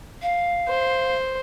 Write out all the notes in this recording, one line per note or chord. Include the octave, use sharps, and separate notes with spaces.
F5
C5